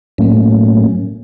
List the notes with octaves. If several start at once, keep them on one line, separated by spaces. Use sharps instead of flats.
A2 F#3 A3 A#3 C#4